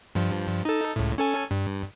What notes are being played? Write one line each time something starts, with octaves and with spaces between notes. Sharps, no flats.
G2 F3
D#4 A4
C#2 A2
C#4 A4 G#5
G2